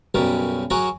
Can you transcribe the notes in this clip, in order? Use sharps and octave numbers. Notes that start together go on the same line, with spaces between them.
B1 F#2 C#3 G3 A#4
F#3 F#4 G#4 A#4 C#5